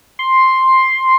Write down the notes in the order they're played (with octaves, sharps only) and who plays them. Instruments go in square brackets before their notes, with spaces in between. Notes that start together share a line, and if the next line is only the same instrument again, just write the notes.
[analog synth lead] C6